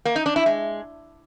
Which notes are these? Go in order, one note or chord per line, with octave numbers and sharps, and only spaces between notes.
A#3
D#4
D4
E4
G#3